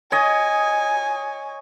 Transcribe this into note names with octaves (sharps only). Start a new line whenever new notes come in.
C#5 D#5 G#5